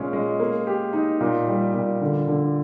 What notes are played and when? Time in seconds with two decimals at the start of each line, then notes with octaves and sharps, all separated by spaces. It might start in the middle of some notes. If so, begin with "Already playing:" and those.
Already playing: A#2 G#3 C#4
0.13 G#3
0.40 A#3
0.67 G4
0.93 D#4
1.21 A#2
1.48 G3
1.74 A#2
2.02 D3
2.28 D3